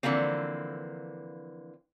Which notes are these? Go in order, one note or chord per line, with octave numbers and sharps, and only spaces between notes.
D3 E3 F3 A#3 C4